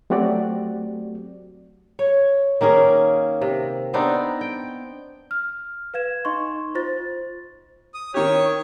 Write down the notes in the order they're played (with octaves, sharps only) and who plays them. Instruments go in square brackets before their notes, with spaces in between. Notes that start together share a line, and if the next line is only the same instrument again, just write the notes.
[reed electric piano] F#3 A3 C4 F#4 G4 D5
[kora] C#5
D#3 A#3 C#4 G#4
C3
B3 C4 D4 D#4
G5
[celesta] F6
B4 F5 G#6 E7
D#4 D#5 C6 C#6
F4 C5 A6
[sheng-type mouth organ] D#6
[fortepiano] D#3 G4 [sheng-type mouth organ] C#5